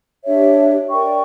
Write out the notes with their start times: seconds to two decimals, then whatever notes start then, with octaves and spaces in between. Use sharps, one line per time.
0.24 D4 G4 C#5 E5
0.89 A#4 D5 G5 C#6